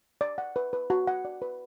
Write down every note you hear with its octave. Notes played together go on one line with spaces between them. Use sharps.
D5
F#5
B4
B4
F#4
F#5
D5
B4